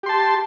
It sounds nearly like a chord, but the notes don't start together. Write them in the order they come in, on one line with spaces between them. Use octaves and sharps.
G4 C6 A5